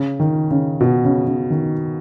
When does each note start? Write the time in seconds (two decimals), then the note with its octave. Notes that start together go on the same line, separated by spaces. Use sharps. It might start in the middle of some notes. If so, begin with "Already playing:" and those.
Already playing: C#3
0.20 D#3
0.51 C#3
0.81 B2
1.04 C#3
1.27 C#3
1.50 D#3